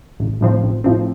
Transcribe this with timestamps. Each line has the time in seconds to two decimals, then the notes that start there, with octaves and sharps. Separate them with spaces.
0.20 A1
0.41 A2 F3 C4
0.62 A1
0.84 A2 F3 C4